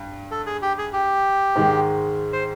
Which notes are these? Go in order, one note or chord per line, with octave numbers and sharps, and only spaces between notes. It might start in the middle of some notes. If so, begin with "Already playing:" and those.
Already playing: G2
A4
G#4
G4
G#4
G4
G#2 D#3 G#3
C5